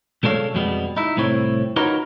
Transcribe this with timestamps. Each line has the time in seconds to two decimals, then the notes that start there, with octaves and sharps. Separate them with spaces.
0.23 B2 G#3 D4 A4 C#5 F5
0.54 F2 B2 G3 G#3 B3
0.97 D#4 E4
1.17 C2 A2 C4 E4 C#5
1.76 D#4 F4 F#4 A#4 B4 C#5